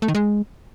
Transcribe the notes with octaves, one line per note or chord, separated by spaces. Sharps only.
A3
D#3
G#3